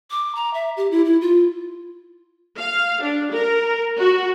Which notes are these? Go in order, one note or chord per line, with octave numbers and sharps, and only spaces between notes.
D6
A#5
E5
G4
E4
E4
F4
F5
D4
A#4
F#4